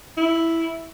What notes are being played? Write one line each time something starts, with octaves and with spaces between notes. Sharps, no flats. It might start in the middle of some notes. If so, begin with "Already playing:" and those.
E4